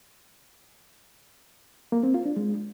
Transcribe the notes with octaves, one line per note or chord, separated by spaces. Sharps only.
A#3
C4
F4
D4
G#3